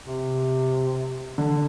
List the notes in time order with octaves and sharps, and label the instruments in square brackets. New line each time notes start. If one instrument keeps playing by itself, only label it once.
[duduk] C3
[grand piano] D3